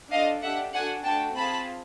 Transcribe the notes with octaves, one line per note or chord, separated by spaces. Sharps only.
D4 F4 A4 D#5 F5
D4 G4 E5 F#5
D4 F#4 A4 F#5 G#5
A3 D4 F#4 G5 A5
C4 F4 G#4 A5 B5